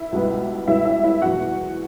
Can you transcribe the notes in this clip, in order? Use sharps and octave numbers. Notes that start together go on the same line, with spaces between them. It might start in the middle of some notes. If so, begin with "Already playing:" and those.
Already playing: E4 E5
C#2 B2 G3 B3
C#2 B2 G3 B3 E4 E5
E4 E5
E4 E5
F#1 E2 B2 F#4 F#5